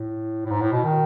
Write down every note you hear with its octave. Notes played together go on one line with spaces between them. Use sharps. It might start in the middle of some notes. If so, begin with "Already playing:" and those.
Already playing: A2
A2
G#2
A2
B2
D#3